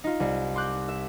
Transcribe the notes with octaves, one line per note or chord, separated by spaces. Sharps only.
D#4 F4
C2
C6 D6 F#6 G6
E5